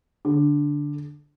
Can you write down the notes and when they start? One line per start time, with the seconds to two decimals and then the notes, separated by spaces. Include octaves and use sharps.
0.25 D3